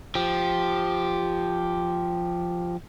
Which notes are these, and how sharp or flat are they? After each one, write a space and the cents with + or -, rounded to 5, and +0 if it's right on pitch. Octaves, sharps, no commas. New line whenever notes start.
F3 +0 G4 +0